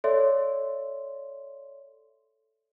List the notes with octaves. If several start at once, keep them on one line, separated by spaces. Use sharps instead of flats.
A4 C#5 D5 E5 C6